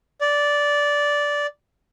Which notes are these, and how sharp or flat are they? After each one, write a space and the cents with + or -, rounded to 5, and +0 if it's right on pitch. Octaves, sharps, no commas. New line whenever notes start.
D5 -10